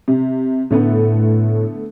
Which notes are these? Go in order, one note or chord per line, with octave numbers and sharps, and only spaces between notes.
C3
A2 D3 A3 B3